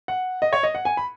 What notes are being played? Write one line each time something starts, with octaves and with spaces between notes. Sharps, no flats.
F#5
D#5
C#5
D#5
F#5
G#5
B5